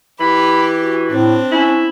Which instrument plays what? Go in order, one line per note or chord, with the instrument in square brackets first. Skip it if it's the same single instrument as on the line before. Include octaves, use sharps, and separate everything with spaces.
[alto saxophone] E3 [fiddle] G4 [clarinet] B5
[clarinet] F#4
[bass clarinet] A2 [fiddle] C4 [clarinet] D4
[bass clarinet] C#4 [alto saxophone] E4